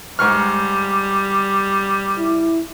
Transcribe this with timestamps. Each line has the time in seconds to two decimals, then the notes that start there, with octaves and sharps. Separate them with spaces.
0.19 G#2 G3 C#6 F6
2.18 E4